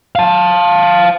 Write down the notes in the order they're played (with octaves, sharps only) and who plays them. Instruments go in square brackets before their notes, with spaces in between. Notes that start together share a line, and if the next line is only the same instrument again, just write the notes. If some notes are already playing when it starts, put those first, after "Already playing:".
[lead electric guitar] F5 A5